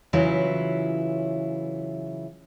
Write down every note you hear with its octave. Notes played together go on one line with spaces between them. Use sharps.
C#3 E3 F#3 E4 F4 B4